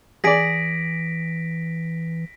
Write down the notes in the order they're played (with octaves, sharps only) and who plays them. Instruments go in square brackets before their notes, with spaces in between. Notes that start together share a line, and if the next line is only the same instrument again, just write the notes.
[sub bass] E3 [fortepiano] G#4 D5 [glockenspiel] A#6 B6 D7